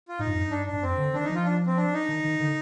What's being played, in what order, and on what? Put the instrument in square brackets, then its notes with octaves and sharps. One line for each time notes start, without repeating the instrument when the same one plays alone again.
[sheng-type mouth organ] F4
[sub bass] G#2 [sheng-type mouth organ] D#4
[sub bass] G2
F2
G2
[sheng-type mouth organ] D4
D4
[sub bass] G2
[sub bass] F2 [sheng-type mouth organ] C4
[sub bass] D3
[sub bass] D#3 [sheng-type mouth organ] D4
[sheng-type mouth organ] D#4
[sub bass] F3
[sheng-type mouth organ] F4
D4
C4
D4
D#4
[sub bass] D#3
D#3
D3